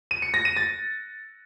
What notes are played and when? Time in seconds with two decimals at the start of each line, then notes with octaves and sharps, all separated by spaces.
0.11 D#7
0.22 C#7
0.34 A#6
0.45 D#7
0.57 A6